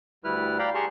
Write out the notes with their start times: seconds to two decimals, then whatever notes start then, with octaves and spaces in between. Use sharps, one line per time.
0.24 D2 G3 E4 B4 F6
0.59 D5 F5 G5 A#5 B5
0.75 G4 G#4 A5 A#5 C6 C#6